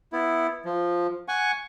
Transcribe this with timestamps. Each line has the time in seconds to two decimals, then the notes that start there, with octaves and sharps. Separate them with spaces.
0.13 B3 E4
0.65 F3
1.28 F#5 G#5 C#6